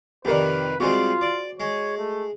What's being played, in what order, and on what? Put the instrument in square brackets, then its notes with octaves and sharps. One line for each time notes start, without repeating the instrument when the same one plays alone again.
[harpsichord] F2 C3 D#3 [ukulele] G4 A#4 D5 [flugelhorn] B4
[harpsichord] C3 G3 G#3 [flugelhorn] F4 [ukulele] F#4 G#4 C5
[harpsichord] D5
[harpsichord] G#3 [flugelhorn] C#5
[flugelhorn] A3